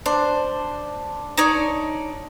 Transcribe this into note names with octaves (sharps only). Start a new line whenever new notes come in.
D4 C5
D#4 C#5 D5